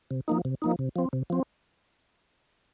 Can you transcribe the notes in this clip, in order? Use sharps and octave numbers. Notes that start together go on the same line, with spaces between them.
C3
F3 A#3 D#4
C3
F3 A#3 D#4
C3
F3 C4
C3
F3 C4